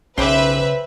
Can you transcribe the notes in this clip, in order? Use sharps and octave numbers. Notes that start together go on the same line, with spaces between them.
B1 C#3 C#4 B4 C5 E5 G5 D6